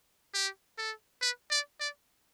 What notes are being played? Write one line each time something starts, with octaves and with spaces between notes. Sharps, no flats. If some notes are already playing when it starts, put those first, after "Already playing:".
G4
A4
B4
D5
D5